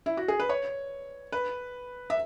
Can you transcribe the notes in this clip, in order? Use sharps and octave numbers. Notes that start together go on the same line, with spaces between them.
E4
F#4
G#4
B4
C#5
B4
E5